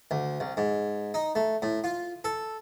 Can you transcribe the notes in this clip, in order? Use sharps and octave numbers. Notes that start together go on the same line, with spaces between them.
D2
C2
G#2
D#4
A3
A2
F4
A4